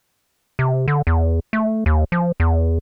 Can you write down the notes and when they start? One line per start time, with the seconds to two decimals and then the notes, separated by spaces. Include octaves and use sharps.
0.59 C3
0.88 D3
1.07 E2
1.53 A3
1.86 D#2
2.12 F3
2.40 E2